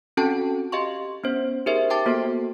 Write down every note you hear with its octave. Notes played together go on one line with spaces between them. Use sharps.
C4 C#4 F#4 A4 G5 A5
G4 D#5 F5 C6 C#6
B3 C#4 C5
D#4 G4 G#4 A#4 C5 E5
G5 A5 D6 A6
A#3 B3 F#4 A4 C5